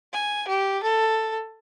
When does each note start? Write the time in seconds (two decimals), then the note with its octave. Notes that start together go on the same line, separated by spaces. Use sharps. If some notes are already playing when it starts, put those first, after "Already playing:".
0.13 G#5
0.48 G4
0.83 A4